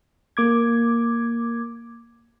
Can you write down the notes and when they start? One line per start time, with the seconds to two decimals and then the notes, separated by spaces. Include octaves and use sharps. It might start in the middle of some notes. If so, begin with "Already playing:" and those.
0.37 A#3 D6 G#6